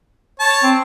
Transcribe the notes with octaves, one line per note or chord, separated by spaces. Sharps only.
C#5 A5
C4